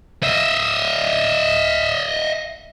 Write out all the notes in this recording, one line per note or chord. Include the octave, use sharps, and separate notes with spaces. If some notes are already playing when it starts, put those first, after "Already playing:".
D#5 E5